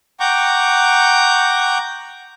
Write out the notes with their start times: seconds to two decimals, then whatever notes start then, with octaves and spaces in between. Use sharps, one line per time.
0.20 F#5 G5 A#5 C#6 D6 G6